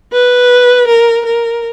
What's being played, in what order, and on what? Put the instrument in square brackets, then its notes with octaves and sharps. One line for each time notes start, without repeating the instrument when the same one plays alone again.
[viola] B4
A#4
A#4